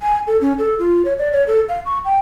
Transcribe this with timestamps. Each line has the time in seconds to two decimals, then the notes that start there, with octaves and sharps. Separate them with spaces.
0.02 G#5
0.27 A4
0.41 C#4
0.58 A4
0.79 F4
1.05 C#5
1.19 D5
1.32 C#5
1.47 A4
1.69 F5
1.86 C#6
2.05 G5